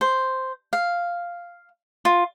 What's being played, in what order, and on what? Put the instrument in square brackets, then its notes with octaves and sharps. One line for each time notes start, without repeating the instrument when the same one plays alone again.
[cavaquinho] C5
F5
F4